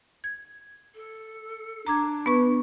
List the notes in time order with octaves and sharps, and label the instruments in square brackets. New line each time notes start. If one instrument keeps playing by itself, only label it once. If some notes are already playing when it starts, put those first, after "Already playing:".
[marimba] G#6
[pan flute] A4
[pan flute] D4 [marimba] A#5 D6 G#6
[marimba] B3 B4 C#6